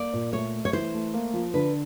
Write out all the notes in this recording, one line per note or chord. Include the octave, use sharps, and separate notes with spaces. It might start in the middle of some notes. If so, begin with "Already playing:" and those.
Already playing: A#3 D5
A#2
A3 C#5
A3
C#5
E3 C5
A3
A#3
F3
D3 B4